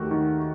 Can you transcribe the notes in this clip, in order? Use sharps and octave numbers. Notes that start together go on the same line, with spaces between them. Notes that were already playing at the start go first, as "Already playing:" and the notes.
Already playing: D#2 D#3 A3 F#4 G4
D#3